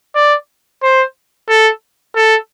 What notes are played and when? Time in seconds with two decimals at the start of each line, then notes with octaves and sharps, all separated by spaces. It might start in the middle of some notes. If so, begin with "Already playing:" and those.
0.15 D5
0.83 C5
1.49 A4
2.15 A4